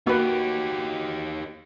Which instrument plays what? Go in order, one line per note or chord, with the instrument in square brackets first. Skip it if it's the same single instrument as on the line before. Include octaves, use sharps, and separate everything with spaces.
[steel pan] A#3 B4 [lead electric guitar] D#4 G4 [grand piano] F#4